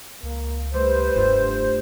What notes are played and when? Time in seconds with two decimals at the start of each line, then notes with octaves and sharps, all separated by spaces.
0.23 C#2 A#3
0.74 G3 A3 B4 C5
1.15 F1 G2 A3 F4